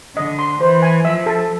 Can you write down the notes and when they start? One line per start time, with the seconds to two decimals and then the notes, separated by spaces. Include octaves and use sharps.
0.17 D3 D#5
0.39 C6
0.60 E3 C5
0.82 G#5
1.04 F3 E5
1.26 A4